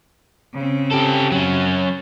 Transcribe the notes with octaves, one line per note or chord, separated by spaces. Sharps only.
C#3 C4
G4 A4
F#3 C#4